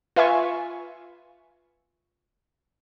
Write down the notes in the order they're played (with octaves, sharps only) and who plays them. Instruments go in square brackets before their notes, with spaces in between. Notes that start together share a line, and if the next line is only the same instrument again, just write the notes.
[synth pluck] F4 B4 E5 F5 G#5 C#6